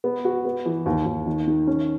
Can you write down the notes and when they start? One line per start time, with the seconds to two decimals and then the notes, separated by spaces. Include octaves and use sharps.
0.04 B3
0.25 F#4
0.45 B3
0.66 E3
0.86 D#2
1.06 D#2
1.27 D#3
1.47 D#3
1.67 C#4